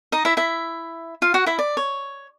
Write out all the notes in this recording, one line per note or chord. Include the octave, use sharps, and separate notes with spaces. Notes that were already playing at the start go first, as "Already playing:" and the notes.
D#4 D#5
E4 E5
E4 E5
F4 F5
F#4 F#5
E4 E5
D5
C#5